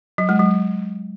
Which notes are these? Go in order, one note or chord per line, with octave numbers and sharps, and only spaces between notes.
F#3
G#3
F#3